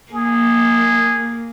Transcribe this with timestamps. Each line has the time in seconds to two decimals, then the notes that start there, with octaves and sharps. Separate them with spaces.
0.12 A#3 G#4